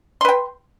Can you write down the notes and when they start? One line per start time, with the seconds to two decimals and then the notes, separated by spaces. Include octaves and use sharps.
0.21 C6
0.25 B4
0.29 G5